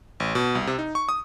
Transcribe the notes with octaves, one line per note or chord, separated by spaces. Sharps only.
A1
B2
C2
C3
D#4
C#6
D#6